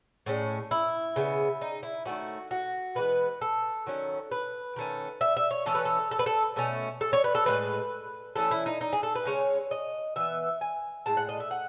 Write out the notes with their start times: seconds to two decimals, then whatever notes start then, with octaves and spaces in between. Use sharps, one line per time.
0.26 A2 G#3 C#4
0.71 E4
1.16 C#3 G#3 B3
1.61 D#4
1.83 E4
2.05 D#3 A3 C#4 F#4
2.51 F#4
2.95 E3 G#3 B3 B4
3.41 A4
3.87 D#3 F#3 C#4
4.32 B4
4.76 D#3 A3 C#4
5.21 E5
5.37 E5
5.51 C#5
5.66 E3 A3 C#4 A4
5.75 B4
5.85 A4
6.11 A4
6.19 B4
6.26 A4
6.56 B2 A3 C#4
7.01 A4
7.13 C#5
7.24 B4
7.35 A4
7.46 A2 E3 G#3 B4
8.36 E3 A3 C#4 A4
8.51 E4
8.66 D#4
8.81 D#4
8.93 G#4
9.03 A4
9.15 B4
9.25 C#3 G#3 C#4 C#5
9.71 D#5
10.16 E3 B3 E5
10.61 G#5
11.06 A2 G#3 A5
11.17 F#5
11.29 D#5
11.40 E5
11.51 F#5